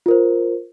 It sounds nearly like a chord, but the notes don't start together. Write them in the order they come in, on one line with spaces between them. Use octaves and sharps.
F4 A#4 C5